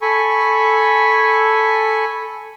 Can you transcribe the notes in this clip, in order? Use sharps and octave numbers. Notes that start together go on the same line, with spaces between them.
A4 G#5 B5 C#6